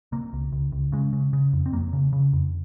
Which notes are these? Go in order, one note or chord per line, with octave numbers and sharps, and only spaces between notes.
C3 A#3
C#2
C#2
C#2
C#3 G#3
C#3
C#3
F2
C4
F2 A#3
C#3
C#3
F2